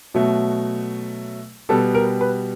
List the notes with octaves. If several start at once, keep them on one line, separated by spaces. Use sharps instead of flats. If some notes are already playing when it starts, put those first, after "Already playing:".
B2 F#3 A3
B2 G3 B3 A4
A#4
B4